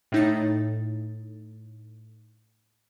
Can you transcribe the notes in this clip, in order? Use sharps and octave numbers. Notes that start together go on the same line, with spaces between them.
A2 D#4 A6